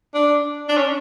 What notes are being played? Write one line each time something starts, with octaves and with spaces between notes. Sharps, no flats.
D4
D4
C#4